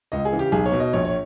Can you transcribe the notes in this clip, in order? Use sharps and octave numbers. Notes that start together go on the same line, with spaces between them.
C#2 D#5
G#4
C#3 E3
G4
B1 G#4
C#5
B2
D#5
A#1 C#5
C#5